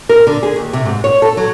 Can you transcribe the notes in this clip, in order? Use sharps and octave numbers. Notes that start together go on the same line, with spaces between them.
A#4
D3
G#4
D#2
C3
G#2
C#5
A4
F#3